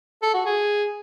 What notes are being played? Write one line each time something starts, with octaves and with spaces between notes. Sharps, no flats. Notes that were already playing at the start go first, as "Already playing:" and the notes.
A4
F#4
G#4